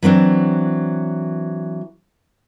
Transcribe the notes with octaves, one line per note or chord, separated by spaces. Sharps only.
E3 F#3 C4 D4